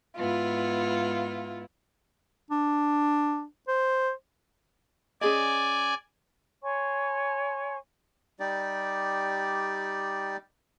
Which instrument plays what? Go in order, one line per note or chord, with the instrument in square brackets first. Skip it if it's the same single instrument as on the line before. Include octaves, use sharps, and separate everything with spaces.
[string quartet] G#2 B3 E4 [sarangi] F4
[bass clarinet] D4
C5
[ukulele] C#4 G#4 D#5 [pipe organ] D5 G#5
[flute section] C#5 G#5 C6 C#6
[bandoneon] G3 D#4 G4 D5